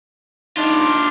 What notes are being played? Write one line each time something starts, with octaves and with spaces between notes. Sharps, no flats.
D4 D#4 F4